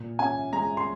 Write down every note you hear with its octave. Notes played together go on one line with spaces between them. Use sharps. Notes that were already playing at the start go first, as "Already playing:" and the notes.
Already playing: A#2
C#4 G#5
G#3 A#5
C6